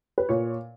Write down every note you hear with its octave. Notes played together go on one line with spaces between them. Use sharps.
B4
A#2 C#5